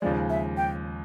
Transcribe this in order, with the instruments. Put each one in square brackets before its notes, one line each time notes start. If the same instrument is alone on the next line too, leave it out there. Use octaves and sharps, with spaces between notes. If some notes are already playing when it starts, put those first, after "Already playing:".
[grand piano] D#2 C#3 F3 G#3 [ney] D5
[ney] E5
G5